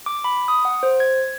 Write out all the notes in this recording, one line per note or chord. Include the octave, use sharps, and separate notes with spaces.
D6
B5
D#6
F#5
C5
G#6